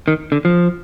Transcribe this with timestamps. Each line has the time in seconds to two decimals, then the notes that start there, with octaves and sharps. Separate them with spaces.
0.08 D#3
0.32 D3
0.45 F3